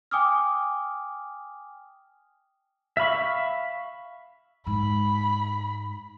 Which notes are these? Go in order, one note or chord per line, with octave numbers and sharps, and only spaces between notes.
G5 G#5 D6 D#6 F6
E5 F5 B5 C#6
G#2 B5